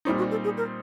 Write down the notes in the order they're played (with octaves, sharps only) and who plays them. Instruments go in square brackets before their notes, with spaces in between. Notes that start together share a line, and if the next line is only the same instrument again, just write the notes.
[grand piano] A#2 G3 C4 D#4 [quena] E4
[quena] F#4
A4
G#4
A#4